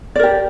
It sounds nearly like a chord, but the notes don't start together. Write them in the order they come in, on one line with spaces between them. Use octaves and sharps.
D5 A#4 G4